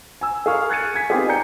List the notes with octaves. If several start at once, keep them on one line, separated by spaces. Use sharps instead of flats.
G#5 E6
G#4 A#4 F5 C#6 F6
F#6 G#6 A6 C#7 D#7
G#5 G#6 B6
B3 C4 D#4 F4 G4 G#4
D5 G#5 A#5 G6 C#7